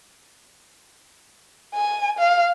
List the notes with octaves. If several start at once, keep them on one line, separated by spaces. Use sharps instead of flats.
G#5
F5